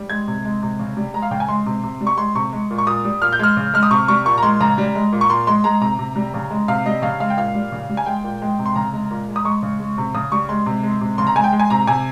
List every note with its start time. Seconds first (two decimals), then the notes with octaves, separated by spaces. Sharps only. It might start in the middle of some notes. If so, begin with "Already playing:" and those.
Already playing: G3
0.10 G#3 G#6
0.27 C3
0.45 G#3
0.63 C3
0.79 C#3
0.97 G3
1.14 G#3 A#5
1.22 F5
1.31 C#3 G5
1.40 G#5
1.48 G#3 C6
1.66 C3
1.83 C3
2.01 G3
2.07 C#6
2.17 G#3 C6
2.35 C3 C#6
2.53 G#3
2.70 A#2
2.78 C#6
2.87 A#2 D#6
3.05 G3
3.22 A#2 F6
3.33 G6
3.39 G#3 F6
3.57 C#3
3.74 G#3 F6
3.83 D#6
3.91 C3 C#6
4.08 G3 C#6
4.25 A#2 C#6
4.38 A#5
4.43 G#3 C6
4.60 C#3 A#5
4.78 G3
4.95 G#3
5.13 A#2
5.21 C#6
5.30 A#2 C6
5.47 G#3 C6
5.64 G#3 A#5
5.81 C3 A#5
5.99 C3
6.16 G3
6.34 C#3
6.51 G#3
6.68 C3 F5
6.86 G3 D#5
7.02 C#3 F5
7.20 G#3 F5
7.30 G5
7.37 A#2 F5
7.55 G3
7.72 C#3
7.90 G3
7.97 G#5
8.06 G#3 G5
8.24 A#2
8.42 G#3
8.59 C3
8.66 C6
8.76 C#3 A#5
8.93 G#3
9.11 A#2
9.28 G#3
9.36 D#6
9.45 G#3 C#6
9.63 C#3
9.80 G#3
9.98 C3
10.14 C#3 D#6
10.32 G3 C#6
10.49 G#3 C6
10.66 C3
10.83 G#3
11.01 C3
11.18 C#3 C6
11.27 A#5
11.36 G#3 G#5
11.44 G5
11.53 G#3
11.60 G#5
11.70 C3 A#5
11.87 C3 G#5